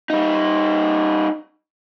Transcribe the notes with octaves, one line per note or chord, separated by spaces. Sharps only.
G3 D#4